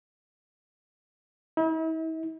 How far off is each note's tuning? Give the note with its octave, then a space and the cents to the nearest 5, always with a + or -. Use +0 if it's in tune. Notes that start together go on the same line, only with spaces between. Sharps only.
E4 -45